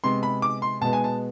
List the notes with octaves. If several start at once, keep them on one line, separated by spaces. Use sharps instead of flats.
C3 G#3 B3 C6
B5
D6
C6
B2 G#3 B3 A5
G#5
A5